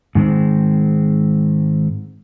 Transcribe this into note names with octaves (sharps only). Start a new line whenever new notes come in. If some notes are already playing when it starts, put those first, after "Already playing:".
G#2 D#3 G#3 C4